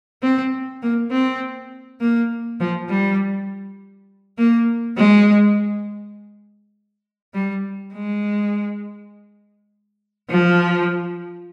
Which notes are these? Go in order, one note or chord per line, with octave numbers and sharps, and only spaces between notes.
C4
A#3
C4
A#3
F3
G3
A#3
G#3
G3
G#3
F3